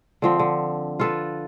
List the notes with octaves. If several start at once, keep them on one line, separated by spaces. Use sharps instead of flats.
D3 F3 C4
D3
F4 A4 B4